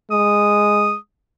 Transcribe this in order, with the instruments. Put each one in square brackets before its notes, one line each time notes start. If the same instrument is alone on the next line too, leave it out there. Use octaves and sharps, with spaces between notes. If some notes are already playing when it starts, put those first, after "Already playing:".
[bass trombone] G#3 [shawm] D#6